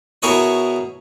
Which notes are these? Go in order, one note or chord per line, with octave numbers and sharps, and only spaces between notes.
B2 E4 G#4 A#4 C#5 D#6